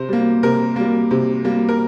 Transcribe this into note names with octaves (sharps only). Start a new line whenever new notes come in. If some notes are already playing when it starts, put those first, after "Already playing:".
Already playing: C3 C5
G3 A#3
C3 A#4
G3 A#3
C3
G3 A#3
A#4